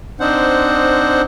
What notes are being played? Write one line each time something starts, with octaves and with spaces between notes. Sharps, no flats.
C4 D4 D#4 C5 F#5